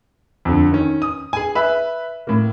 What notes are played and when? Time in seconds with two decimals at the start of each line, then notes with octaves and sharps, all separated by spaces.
0.45 F2 D3
0.72 D#3 C#4
1.02 D#6
1.33 G#4 G#5
1.55 B4 E5
2.27 A2 A#3